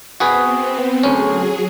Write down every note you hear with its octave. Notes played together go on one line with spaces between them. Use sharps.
B3 C4 F#4 G#4 B4
D2 F#3 C#4 G#4